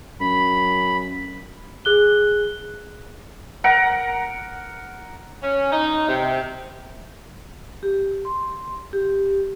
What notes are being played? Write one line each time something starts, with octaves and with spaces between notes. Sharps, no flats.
F#2 B5
G#4 F#6 G7
A#4 F#5
C#4
D#4
C3
G4
C6
G4